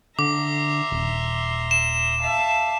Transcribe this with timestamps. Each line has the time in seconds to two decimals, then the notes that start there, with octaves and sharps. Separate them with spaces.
0.19 D3 E5 A#5 C6 D6
0.92 D#1
1.71 E7
2.21 E5 F5 A5